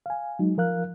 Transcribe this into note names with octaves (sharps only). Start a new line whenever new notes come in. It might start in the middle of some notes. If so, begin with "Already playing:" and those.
F5 G#5
F#3 G#3 D#4
F3 A#4 F5 F#6